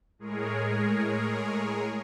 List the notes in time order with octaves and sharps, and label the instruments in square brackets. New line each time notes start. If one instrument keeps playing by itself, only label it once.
[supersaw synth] A2 G#3 G#4 A#4 C#5